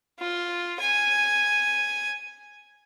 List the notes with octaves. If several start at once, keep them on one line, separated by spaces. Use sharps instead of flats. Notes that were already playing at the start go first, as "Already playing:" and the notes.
F4
G#5